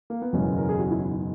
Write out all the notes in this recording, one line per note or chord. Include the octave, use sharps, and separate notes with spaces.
A#3
B3
F#1 E2 B2 G#3 C#4
A#4
G#4
F#4
E4
D#4